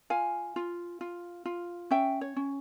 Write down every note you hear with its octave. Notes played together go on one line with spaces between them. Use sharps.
F4 F5 G#5
F4
F4
F4
C#4 E5 G5
C#5
C#4